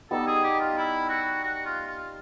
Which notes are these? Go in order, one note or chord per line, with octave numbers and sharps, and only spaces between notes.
G3 B3 D#4 A4
G#4
G4
F4
E4
F#4
F#4
F4
F4